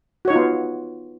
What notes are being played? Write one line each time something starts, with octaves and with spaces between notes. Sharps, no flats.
B3 D#4 F4 F#4 C#5